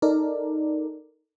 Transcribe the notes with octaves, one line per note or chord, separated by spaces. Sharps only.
D#4 A4 A#4 D5